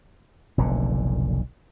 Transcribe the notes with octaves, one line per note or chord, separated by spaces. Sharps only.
F1 B1 A#2 D3